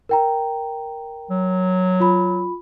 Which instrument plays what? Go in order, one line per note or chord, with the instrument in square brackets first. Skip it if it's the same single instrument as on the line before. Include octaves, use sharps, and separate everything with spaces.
[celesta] A#4 G5 A#5
[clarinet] F#3
[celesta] F4 B5